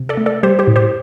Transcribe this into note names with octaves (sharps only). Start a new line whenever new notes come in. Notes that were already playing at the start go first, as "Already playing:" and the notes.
Already playing: C3
A4 D5
A3
A4 D5
G3 G4 C5
G4 C5
A2
G4 C5